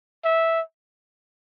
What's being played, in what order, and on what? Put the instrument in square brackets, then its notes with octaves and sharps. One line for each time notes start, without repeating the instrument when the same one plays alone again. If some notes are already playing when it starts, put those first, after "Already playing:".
[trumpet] E5